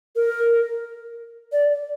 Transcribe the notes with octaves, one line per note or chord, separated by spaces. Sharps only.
A#4
D5